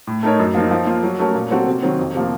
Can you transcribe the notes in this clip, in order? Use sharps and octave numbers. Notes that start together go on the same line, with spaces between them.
A2
A3 D#4 A#4 C#5
F#2
F3 A#3 D#4
F3
A#3 F4
F#3
A3 C#4 F#4 A#4
A#2
F#3 C4 F#4 A4
C3
D#3 F#3 C4
F2
C3 F3 A#3